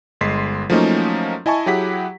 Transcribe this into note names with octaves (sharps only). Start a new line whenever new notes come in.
G1 G#3 C6 B6 C7
F3 F#3 A3 A#3 C#4 D#4
E4 D#5 G#5 A5 C#6
F#3 E4 G4 G#4 F#5 B6